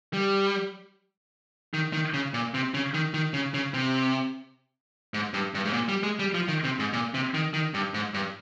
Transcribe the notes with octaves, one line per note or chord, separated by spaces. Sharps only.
G3
D#3
D#3
C#3
A#2
C3
C#3
D#3
D#3
C#3
C#3
C3
G#2
G2
G2
G#2
A#2
G3
G#3
G3
F3
D#3
C3
G#2
A#2
C3
D#3
D#3
G2
G#2
G2